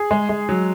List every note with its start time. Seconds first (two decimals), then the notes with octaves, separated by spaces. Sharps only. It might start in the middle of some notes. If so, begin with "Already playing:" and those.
Already playing: G#4
0.11 G#3
0.29 G#3
0.49 F#3